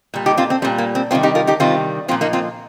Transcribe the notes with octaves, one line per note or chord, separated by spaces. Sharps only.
A#2 G3
D#4 G4
C4 F4
C4
A#2 G3 C4
A#3
C4
C3 D#3 G3 C4 F4
D#4 G4
F4 A#4
D#4 G4
C3 D#3 G3 C4 F4
A#2 F3 C4 F4
A#3 D#4
C4 F4